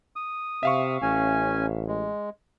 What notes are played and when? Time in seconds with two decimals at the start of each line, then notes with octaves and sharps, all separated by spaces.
0.16 D#6
0.63 C3 E5 F5 C#6
1.02 A1 C#4 G#5
1.88 G#3